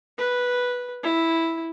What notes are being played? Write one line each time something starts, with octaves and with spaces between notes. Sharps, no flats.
B4
E4